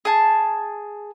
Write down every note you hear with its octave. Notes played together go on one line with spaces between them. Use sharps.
G#4 A5